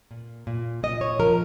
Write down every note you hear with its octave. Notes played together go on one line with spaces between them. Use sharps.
A#2
A#2
A#2 D#5
C#5
F3 A#4